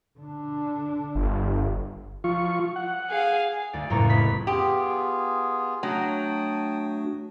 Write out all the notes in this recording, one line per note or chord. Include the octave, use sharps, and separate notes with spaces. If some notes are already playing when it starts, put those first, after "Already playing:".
D3 D4
G1
F3 F4 C#6
F#5
G#4 F5
D2 D5
F#1 F2 A2 A#3 A#5 C#6
F1 G#3 B5 B6
B3 F4 G4 G#4
F#3 A3 D4 F#4 G5 A5 D#6